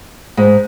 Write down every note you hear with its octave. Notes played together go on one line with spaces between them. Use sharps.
G#2